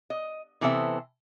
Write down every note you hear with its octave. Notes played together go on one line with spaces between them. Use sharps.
D#5
C3 E3 B3 A4 C5 E5